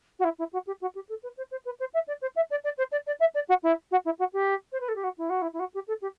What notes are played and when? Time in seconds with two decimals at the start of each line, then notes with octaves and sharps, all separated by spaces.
0.19 F#4
0.24 E4
0.38 E4
0.52 F#4
0.67 G4
0.81 F#4
0.95 G4
1.09 A4
1.23 B4
1.37 C5
1.51 C5
1.65 B4
1.79 C5
1.93 E5
2.07 D5
2.21 C5
2.35 E5
2.50 D5
2.64 D5
2.77 C5
2.91 D5
3.06 D5
3.19 E5
3.34 D5
3.48 F#4
3.63 E4
3.91 F#4
4.05 E4
4.19 F#4
4.33 G4
4.72 C5
4.80 B4
4.88 A4
4.95 G4
5.03 F#4
5.18 E4
5.29 F#4
5.41 E4
5.53 E4
5.59 F#4
5.74 G4
5.87 A4
6.01 G4